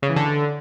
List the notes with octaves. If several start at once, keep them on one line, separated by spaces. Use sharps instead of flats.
C#3
E3
D3